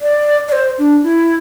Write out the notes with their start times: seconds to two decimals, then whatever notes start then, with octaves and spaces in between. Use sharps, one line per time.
0.01 D5
0.48 D5
0.52 C5
0.78 D4
1.03 E4